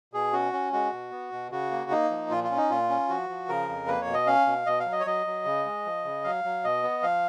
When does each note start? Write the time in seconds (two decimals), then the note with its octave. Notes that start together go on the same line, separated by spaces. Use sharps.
0.13 B2 G#4
0.33 C#4 F#4
0.53 C#4
0.73 G#3 F#4
0.92 B2
1.11 B3
1.32 B2
1.51 C#3 F#4
1.71 A#3
1.90 A#3 D#4
2.10 F3
2.30 A#2 F4
2.44 F4
2.50 C#4
2.57 D#4
2.70 A#2 F4
2.89 C#4
3.09 F3 F#4
3.29 F3
3.49 C#3 A#4
3.69 F2
3.88 A#3 B4
4.01 C#5
4.07 B2
4.14 D#5
4.27 C#4 F5
4.46 B2
4.66 B2 D#5
4.80 F5
4.86 F#3
4.92 D#5
5.00 C#5
5.06 F#3 D#5
5.26 F#3
5.45 C#3
5.65 G#3
5.86 F3
6.05 C#3
6.24 F#3 F5
6.44 F#3
6.64 B2 D#5
6.83 B3
7.03 F3 F5